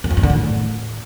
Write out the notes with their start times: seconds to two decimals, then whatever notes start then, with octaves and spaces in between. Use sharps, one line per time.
0.04 F#2
0.11 F2
0.17 G2
0.23 D3
0.30 A2